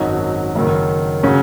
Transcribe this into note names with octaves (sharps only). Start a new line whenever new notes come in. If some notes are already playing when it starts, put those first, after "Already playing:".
Already playing: G#1 F#2 F#3 D#4
F#1 F#2 D#3
C#3 F#3 C#4